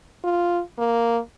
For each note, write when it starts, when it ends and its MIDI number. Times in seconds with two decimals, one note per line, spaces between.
0.24 0.61 65
0.78 1.18 58